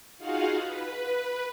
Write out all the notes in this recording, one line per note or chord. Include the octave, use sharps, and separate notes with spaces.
D#4 F4 F#4 G#4 F5 F#5
B4